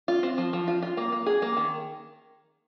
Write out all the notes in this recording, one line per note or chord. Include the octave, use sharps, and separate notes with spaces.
F4
C4
F3
F3
F4
F4
A#3
A#3
G#4
A#3
D#3